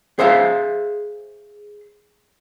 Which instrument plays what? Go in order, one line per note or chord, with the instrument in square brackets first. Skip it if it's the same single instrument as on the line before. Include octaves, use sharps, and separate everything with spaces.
[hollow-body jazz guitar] G#4 C5 E5 F5